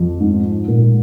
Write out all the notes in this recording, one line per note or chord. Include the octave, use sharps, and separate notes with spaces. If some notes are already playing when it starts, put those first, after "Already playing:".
Already playing: F2 F3
G#2
A#2